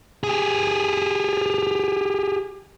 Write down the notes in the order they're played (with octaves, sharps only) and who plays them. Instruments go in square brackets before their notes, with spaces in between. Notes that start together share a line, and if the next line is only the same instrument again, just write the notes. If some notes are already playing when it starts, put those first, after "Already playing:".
[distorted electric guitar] G4 G#4